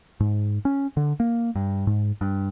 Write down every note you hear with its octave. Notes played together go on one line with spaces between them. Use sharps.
G#2
C#4
D3
A#3
G2
G#2
G2